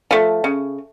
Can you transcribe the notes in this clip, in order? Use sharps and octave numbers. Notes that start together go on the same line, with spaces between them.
F3 A3
C#3